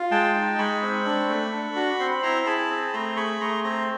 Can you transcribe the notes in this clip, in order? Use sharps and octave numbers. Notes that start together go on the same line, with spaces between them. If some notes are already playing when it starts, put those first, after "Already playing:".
Already playing: F4
G#3 G5 A5
D#4
G#3 B5 C#6
C4
D4
A3
D4
F#4
C4 C6
B5
E4 A#5 C6
G#4 A5 B5
C4
A3 A#5 C6
G#4 B5 C#6
A3 A#5 C6
C4 A#5 C6